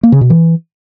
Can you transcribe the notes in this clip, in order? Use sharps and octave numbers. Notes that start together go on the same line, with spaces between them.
A#3
C#3
B2
E3